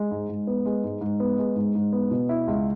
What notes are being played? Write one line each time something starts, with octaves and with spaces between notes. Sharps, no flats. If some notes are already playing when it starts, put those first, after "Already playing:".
Already playing: G#3
G#2
G#2
B3
G#3
G#2
G#2
B3
G#3
G#2
G#2
B3
B2
E4
C#2